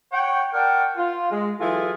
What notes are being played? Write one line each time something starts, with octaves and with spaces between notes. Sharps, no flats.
C#5 F#5 G5
A#4 D5 F#5 G5 A5
F4
G#3
E3 F#3 F4 G#4 A4